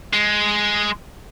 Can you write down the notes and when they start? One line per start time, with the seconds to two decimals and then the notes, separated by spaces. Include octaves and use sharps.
0.14 G#3